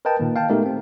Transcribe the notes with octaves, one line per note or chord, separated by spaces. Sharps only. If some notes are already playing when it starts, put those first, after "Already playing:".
A#4 B4 D#5 G5 A5
A#2 D#3 A#3
F5 G5 A5
G#3 A3 B3 D#4 G4 A#4
C4